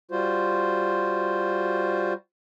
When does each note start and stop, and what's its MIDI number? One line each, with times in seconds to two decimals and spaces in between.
0.11 2.13 55
0.11 2.13 65
0.11 2.13 66
0.11 2.13 72